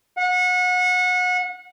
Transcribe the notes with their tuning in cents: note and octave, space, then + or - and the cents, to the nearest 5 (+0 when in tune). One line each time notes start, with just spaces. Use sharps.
F#5 -30